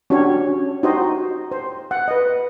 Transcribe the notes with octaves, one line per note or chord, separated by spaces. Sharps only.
C#4 D4 F#4 G4 C#5
D#4 F#4 G4 C5 D#5
C5
F#5
B4 D#5